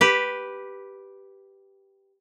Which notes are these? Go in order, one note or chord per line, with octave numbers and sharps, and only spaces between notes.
G4 B4